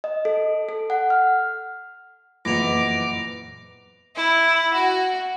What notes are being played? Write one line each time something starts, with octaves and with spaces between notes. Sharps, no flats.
D#5
A4
A4
F#5
F6
F#1 F2 A#2 E3 B3 D6 A#6 F7
E4
F#4